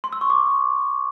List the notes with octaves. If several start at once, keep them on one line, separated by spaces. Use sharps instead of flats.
C6
E6
C#6
D6